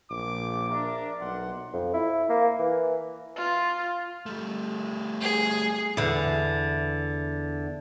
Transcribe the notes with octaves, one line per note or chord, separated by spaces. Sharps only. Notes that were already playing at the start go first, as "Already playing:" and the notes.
A#1 D6
D4 A#4 E5
B1 F#5 C6
F2
E4
A#3
E3
F4
G3 A3
G#4
E2 D3